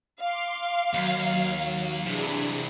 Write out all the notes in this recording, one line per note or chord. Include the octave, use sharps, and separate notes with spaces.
F5 C6 D6
D#2 F#3
C3 E3 D4 G#4 B5